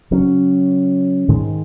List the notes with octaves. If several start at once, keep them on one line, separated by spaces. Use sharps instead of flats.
C#3 F#3 C#4
G#2 D#3 G#3